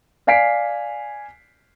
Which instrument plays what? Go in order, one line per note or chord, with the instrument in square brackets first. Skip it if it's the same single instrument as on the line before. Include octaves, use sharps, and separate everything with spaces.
[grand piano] D5 F5 G#5 B6 C7 D7